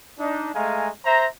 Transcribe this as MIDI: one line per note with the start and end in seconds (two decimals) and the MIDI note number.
0.19 0.49 62
0.19 0.49 63
0.54 0.88 56
0.54 0.88 57
0.54 0.88 77
0.54 0.88 80
0.54 0.88 82
1.04 1.26 72
1.04 1.26 76
1.04 1.26 82